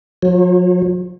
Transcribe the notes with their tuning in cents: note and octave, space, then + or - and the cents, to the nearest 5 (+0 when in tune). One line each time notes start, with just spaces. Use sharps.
F#3 -45